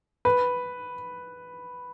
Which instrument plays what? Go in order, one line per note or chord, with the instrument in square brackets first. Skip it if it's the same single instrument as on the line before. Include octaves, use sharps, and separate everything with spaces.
[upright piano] B4